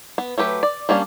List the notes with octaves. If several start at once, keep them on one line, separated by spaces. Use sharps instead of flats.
B3
F#3 A3 G4 B4
D5
G3 A#3 C#4 D4